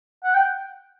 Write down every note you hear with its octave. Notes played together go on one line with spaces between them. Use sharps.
F#5
G5